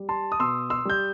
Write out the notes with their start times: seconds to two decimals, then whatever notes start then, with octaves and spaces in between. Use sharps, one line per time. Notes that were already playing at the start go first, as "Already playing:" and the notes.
Already playing: G3
0.09 A5 C6
0.32 D#6
0.39 B2 C6 E6
0.70 C6 E6
0.85 G3 G6